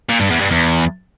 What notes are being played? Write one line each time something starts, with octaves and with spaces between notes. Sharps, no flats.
A#2
G2
E2
G2
E2